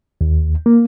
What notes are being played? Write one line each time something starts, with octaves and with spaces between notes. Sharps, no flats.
D#2
A#3